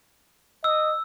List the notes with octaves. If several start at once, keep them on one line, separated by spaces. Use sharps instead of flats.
D#5 E6